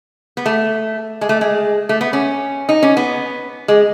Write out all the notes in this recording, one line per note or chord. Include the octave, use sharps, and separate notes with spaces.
B3
A3
G#3
A3
G#3
A3
B3
C#4
D#4
C#4
B3
G#3